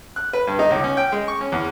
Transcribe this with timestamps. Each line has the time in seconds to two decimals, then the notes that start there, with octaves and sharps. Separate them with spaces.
0.16 F#6
0.33 B4
0.47 G2
0.59 D#4
0.71 C#2
0.84 C#4
0.97 G5
1.12 G#3
1.28 C#6
1.41 C#4
1.52 E2